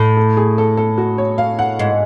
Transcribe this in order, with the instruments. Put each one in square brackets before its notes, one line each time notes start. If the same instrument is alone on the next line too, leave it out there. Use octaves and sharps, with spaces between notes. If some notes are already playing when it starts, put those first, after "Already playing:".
Already playing: [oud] A2
[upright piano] A4
G#4
A4
A4
F#4
C#5
F5
F#5
[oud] G#2